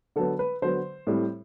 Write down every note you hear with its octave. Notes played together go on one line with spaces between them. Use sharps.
D3 F#3 B3 A4
B4
D3 F#3 B3 C5
A2 G3 C4